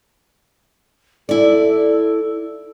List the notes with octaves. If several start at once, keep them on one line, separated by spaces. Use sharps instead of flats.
E4 A4 D5